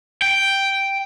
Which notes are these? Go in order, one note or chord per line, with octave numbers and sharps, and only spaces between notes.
G5